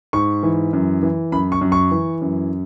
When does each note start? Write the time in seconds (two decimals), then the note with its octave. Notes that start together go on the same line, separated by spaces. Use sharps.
0.13 G#2 C#6
0.43 E3
0.73 F#2
1.03 E3
1.32 F#2 B5
1.52 C#6
1.61 F#2
1.72 C#6
1.91 E3
2.22 F#2